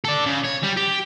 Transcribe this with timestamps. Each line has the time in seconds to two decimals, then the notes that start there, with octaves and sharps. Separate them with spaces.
0.04 A4 D5
0.26 C#3
0.45 C#5
0.63 G3
0.77 G4